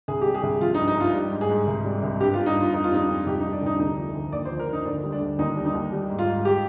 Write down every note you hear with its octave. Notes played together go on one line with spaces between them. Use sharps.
C2 G#4
G3 G4
G#4
C2
F3 F4
D#4
G2
D#4
G2 F4
G3
G#2
G#4
G#2
C2
G3
C2
G2 G4
F4
G3
D#4
G2 F4
F2 D#4
F4
G3 D#4
F2
C2 G4
D#4
G3
D4
C2 D#4
D2 D#4
F3
D2
D#2 D5
C5
F3
A#4
D#2 D#4
D2 D4
G3
D4
D2
D#2 D#4
G3
D#4
D#2
G3
G#2
F4
G#2
G4